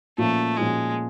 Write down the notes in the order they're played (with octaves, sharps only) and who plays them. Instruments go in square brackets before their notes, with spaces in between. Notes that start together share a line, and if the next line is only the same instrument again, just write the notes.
[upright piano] A#2 F3 A#3 C#4 [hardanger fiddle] A3
[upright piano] A#2 F3 A#3 C#4 [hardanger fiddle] G#3